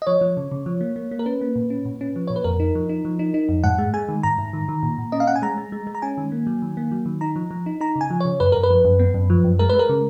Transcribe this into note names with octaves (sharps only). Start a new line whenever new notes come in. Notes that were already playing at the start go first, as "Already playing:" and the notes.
D#5
F3 C#5
F3
C#3
C#3
F3
A#3
A#3
A#3
A#4
C#4 B4
A#3
A#2
C#4
A#2
C#4
F3
A#2 C#5
B4
F2 A#4
D#4
F3
D#4
F3
D#4
D#4
F2
G#2 F#5
G#3
G#3 G#5
D#3
G#2 A#5
G#2
D#3
D#3
A#2
A#2
C#4 D#5
F5
C#4 F#5
G#5
G#3 A#5
G#3
G#3
G#3
A#5
C#4 G#5
D#3
A#3
F#3
D#3
A#3
F#3
D#3
D#4 A#5
F3
F3
D#4
D#4 A#5
C#3
G#5
F3
C#3 C#5
F#2 B4
F#2 A#4
B4
F3
F#2
B3
F#2
F3
F#2
G#3 A#4
G#3 B4
A#4
C#3